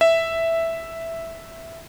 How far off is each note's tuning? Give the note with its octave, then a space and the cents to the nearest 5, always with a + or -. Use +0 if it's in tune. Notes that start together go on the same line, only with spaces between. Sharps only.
E5 +0